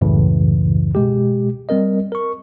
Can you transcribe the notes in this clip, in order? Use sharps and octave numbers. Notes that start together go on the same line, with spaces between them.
C#2 F#2 A2 C#3 E3
B2 G#3 G4
G3 C4 A#4 D#5
A#4 C#6